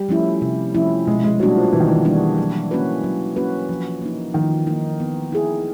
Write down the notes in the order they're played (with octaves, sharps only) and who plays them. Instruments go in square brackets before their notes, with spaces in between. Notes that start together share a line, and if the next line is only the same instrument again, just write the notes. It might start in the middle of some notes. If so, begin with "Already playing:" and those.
Already playing: [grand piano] G3
[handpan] F3 A3 C#4 E4
C3
F3 A3 C#4 E4
[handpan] B2 [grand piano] G#3
[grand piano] G#3
[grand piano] F#3 [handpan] G3 A#3 D4 F#4
[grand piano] F3
[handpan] B2 [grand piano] E3
[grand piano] D#3
E3
[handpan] G3 A#3 D4 F#4
F#3
A#3 C#4 F#4 B4
F#3
A#3 C#4 F#4 B4
F3
A#3 D#4
[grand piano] D#3 [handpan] F3
[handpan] A#3 D#4
B3
E4 G#4